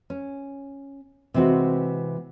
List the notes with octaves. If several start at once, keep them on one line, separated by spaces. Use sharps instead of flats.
C#4
C3 E3 G#3 C4 F#4